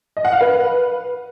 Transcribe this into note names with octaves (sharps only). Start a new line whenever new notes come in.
D#5
F#5
F5
B4